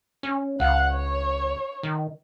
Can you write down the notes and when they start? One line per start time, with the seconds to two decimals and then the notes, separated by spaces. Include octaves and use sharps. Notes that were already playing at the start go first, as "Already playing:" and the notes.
0.23 C#4
0.60 C#2 F5 F#5
0.92 C#5
1.83 D#3